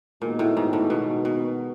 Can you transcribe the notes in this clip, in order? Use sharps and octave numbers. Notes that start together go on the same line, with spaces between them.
A#2 D#3 G#3 B3 D#4 F#4
A2
G#2
A2
B2
B2